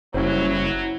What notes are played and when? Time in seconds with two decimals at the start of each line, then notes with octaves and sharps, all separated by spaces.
0.14 F#1 F#3 G3 C#4 E4 C5